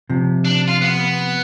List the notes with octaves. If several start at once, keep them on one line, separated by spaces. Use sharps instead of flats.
C3 F3
D4
F4
B3